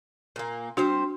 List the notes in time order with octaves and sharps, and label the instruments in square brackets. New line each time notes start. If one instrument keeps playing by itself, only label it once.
[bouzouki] A#2 A#3
[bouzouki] G3 C4 C5 [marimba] D4 F#4